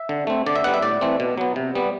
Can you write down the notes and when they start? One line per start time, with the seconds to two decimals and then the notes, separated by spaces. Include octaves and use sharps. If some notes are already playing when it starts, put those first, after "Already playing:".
Already playing: E5
0.09 D3
0.27 A3 C4
0.46 D3 D5
0.55 E5
0.64 G3 B3 F#5
0.74 E5
0.82 A2 D5
1.01 E3 A3 C4
1.20 B2
1.38 F#3 B3
1.56 C3
1.75 G3 B3